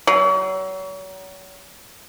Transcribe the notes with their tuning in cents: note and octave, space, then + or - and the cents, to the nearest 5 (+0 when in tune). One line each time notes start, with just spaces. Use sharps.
F#3 +35